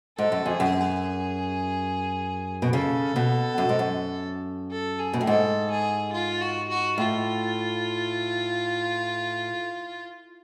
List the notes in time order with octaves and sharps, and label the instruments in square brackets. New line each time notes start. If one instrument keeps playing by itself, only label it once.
[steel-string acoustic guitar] G#2 [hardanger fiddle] A4
[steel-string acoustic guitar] F#2
[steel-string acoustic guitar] F2 [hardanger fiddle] G#4
[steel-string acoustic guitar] F#2
[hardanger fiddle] G#4
[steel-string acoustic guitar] B2
[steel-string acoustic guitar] C#3 [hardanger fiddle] A4
[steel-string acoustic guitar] B2
F#2
G#2
F#2
[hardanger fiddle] A4
G#4
[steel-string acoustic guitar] B2
A2
[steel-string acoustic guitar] G#2 [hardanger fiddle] A4
[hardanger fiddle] G#4
F4
F#4
F#4
[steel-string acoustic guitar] A2 [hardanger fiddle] F4